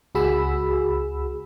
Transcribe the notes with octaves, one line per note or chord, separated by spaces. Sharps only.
C#2 F#4 G#4 B5 E6